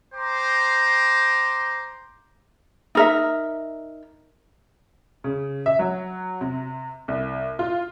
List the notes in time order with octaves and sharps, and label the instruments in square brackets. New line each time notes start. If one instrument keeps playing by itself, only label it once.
[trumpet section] C5 G5 A#5 C6 D6
[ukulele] D#4 A#4 E5
[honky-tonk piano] C#3
E5
F#3
C3
C2
F4